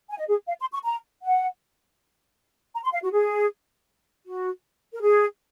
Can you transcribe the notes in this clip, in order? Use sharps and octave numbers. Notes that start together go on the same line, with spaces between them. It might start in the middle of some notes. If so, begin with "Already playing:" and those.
G#5
D#5
G#4
F5
C6
C#6
A#5
F#5
A#5
C6
F5
F#4
G#4
F#4
A#4
G#4